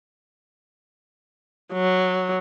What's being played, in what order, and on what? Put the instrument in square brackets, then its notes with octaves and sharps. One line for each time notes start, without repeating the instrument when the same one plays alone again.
[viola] F#3